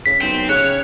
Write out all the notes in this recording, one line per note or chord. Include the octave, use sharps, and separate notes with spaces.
C#3 B6
B1 G5 C6
C#3 C#5 F#6